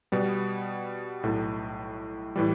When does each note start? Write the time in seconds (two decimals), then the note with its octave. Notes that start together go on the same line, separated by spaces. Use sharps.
0.12 B2 G3 B3
1.23 B1 A2 A3
2.36 A2 E3 G3